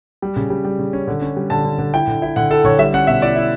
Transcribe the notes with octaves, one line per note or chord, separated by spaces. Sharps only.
G3
C#3
G3
G3
C#3
C#4
D3
C#4
G3
D3 A5
D3
D3
E4 G5
D3
E4
D3 F#5
E4 A4
D3 C#5
G3 E5
C#4 F#5
B2 E5
E4 D5
E4